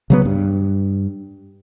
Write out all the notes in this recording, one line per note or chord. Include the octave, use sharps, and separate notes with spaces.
C#3 F#3 B3
G2